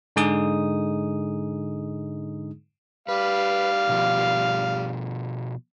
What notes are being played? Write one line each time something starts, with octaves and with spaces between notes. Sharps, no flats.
G#2 D3 G#3 D#4 G#4 D#6
G3 B4 F5
B2 F3